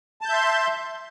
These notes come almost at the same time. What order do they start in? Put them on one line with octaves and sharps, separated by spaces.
A5 G6 E5 C6